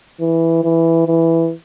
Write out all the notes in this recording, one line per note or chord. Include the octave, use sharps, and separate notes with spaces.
E3
E3
E3